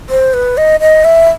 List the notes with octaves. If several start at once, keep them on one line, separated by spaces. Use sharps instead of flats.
C5
B4
D#5
D#5
E5